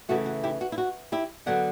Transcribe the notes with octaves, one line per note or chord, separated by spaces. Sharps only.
C#3 E3 A3 F#4
F#4
E4 G4
F#4
E4
F#4
E4 G4
D3 F#3 B3 D5 F#5